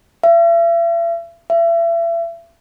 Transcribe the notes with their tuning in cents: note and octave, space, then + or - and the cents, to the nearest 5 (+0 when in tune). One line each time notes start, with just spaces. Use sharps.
E5 +40
E5 +35